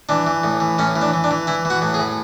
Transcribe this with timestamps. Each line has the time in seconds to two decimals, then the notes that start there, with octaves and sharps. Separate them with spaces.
0.09 E3 D4
0.27 E3
0.43 A2
0.60 E3
0.78 A2 C#4
0.96 E3
1.01 D4
1.14 E3
1.24 D4
1.31 E3
1.47 E3 E4
1.65 E3
1.70 F#4
1.82 A2
1.94 G#4
1.99 A2